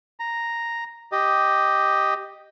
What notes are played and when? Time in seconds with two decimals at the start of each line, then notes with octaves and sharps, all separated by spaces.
0.20 A#5
1.12 G4 D#5